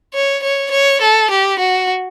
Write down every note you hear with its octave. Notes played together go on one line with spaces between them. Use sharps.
C#5
C#5
C#5
A4
G4
F#4